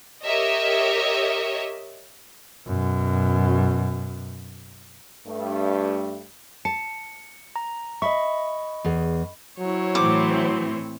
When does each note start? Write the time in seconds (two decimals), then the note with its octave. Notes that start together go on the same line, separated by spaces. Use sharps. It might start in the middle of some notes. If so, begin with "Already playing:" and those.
0.23 G4 A#4 C#5 D#5 E5
2.66 F#2 B2
5.28 G2 A3
6.65 A5 C#7
7.56 A#5
8.02 D#5 E5 B5 C#6
8.84 E2 G#4
9.59 F#3 E4 C5 C#5
9.95 A2 E3 C4 D6